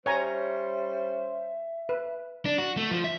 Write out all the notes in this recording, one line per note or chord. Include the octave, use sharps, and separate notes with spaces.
G3 C#4 C5 C#5 E5 G#5 A#5
B4
D4
F#4
A3
F3
E5